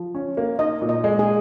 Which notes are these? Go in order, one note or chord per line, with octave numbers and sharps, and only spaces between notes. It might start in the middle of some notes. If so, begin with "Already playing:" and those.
Already playing: F3
C#4
A#3
D#4 D#5
A#2
D#5
G#3
G#4